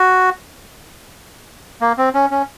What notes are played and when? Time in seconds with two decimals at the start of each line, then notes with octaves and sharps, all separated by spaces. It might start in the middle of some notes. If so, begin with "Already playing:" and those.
Already playing: F#4
1.81 A#3
1.98 C4
2.14 C#4
2.31 C#4